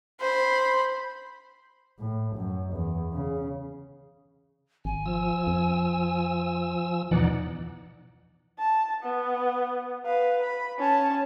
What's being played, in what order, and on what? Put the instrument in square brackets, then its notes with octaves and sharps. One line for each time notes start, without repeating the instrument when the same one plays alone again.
[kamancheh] C5 B5
[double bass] A2
F#2
E2
C#3
[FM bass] G#1 [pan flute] G#5
[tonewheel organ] F3 E6
[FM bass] F2
[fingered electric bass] E2 B2 F3 [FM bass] E3 [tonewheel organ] D#4 D5 F#5
[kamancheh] A5
B3
B4 F5
B5
C#4 A5